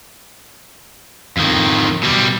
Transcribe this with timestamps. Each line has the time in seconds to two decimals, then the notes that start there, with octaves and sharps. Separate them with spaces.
1.37 F2 D#3
2.03 B2 G3